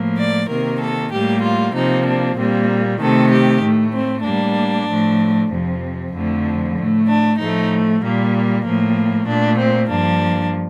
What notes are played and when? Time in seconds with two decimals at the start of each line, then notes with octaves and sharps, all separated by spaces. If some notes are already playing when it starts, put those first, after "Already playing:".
Already playing: A2 F3 A#3
0.18 D5
0.49 C3 D#3 A#3 A#4
0.80 A4
1.12 A2 G3 A#3 G4
1.43 F4
1.75 C3 F3 A#3 D#4
2.05 D4
2.38 A#2 G3 A#3 C4
3.00 C3 D#3 A3 A4
3.32 G4
3.62 A2 A3
3.94 C4
4.25 A2 G3 A#3 D4
4.88 A2 F3 A3
5.51 F2 C3 F3
6.13 F2 D3 F3 A3
6.77 A2 A3
7.08 D4
7.39 A2 F3 A3 D#4
8.02 A#2 G3 A#3
8.64 A2 F3 A#3
9.27 A#2 A3 D4
9.58 C4
9.89 G2 F3 A#3 D4